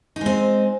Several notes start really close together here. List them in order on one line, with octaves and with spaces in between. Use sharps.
D#4 G#3 C4